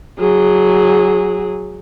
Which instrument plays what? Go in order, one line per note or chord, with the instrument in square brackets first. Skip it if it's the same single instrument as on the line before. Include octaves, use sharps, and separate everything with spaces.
[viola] F#3 G#4